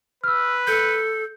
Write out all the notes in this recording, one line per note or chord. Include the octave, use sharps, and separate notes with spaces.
B4 E6 F6
A4 G6